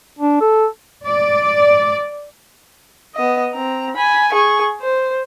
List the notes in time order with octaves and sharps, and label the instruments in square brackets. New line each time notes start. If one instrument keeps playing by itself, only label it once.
[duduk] D4
A4
[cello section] D5
[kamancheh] B3 D#5
C4 A#5
G#5 B5
G#4 C#6
C5